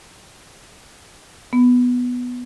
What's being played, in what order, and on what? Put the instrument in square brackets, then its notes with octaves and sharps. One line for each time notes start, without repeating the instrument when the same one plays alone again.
[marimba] B3